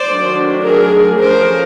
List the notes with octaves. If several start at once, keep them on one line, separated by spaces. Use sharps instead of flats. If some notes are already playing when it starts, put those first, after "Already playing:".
Already playing: C5 D5
D#3 F#3 A3 D4
G#4 A#4
F3 A3 C#4 A#4 C5